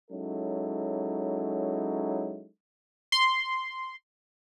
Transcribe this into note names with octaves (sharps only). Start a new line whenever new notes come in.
F#3 G#3 C#4 D#4 E4 A4
C6